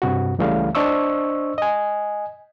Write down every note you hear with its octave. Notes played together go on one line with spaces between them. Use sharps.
G2 C3 F#4
C#2 C#3 E3 G3 A3 F5
D4 C5 D#5 C#6 E6
D#5 G#5